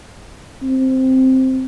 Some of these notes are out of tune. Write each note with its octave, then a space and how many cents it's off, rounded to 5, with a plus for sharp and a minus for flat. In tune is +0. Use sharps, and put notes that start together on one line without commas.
C4 +0